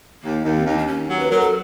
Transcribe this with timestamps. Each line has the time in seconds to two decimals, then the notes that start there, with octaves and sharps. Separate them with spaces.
0.23 D#2 A#3
0.44 D#2
0.55 C4
0.66 D#2 D#4
0.78 D4
0.87 D#2 C#4
1.09 F#3
1.19 B4
1.30 F#3 A#4
1.40 A4